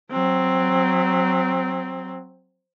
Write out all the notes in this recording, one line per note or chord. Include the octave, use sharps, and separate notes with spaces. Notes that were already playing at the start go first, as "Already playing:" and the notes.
F#3 C4